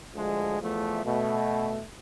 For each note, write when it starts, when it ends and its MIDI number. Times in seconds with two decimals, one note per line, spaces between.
0.14 0.59 38
0.14 0.59 53
0.14 0.59 56
0.61 1.00 40
0.61 1.00 53
0.61 1.00 57
1.05 1.83 47
1.05 1.83 57